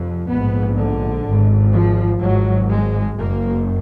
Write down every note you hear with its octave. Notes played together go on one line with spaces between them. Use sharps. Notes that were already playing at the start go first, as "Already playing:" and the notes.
Already playing: F1 F2
A#1 G#2 B3
D3
G#1 G#2
F3
G#1 G#2 F#3
G#3
F#1 F#2 A#3